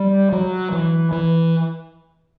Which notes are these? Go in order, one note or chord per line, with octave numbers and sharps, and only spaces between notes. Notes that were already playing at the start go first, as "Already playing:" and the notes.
Already playing: G3
F#3
E3
E3